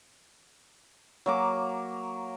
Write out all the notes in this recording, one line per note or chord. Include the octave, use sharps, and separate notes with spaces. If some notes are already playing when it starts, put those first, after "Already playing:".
F#3 A#3 D6